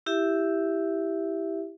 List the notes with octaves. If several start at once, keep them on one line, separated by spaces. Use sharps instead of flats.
E4 G4 E5